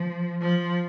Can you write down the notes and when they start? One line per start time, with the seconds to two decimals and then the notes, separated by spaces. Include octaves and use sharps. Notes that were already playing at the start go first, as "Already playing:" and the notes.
Already playing: F3
0.41 F3